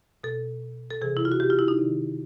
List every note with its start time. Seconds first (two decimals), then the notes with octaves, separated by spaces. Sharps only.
0.24 B2 A4
0.90 A4
1.01 C3 E3 G#4
1.17 E4
1.25 F4
1.32 F#4
1.40 G4
1.50 F4
1.59 E4
1.68 D#4
1.78 C3 D#3